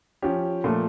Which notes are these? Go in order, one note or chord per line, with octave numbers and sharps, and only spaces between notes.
F3 C#4 G4
A#2 F3 A3